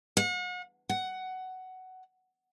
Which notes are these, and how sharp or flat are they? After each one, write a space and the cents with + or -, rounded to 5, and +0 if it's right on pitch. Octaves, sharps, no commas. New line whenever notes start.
F#5 -40
F#5 +15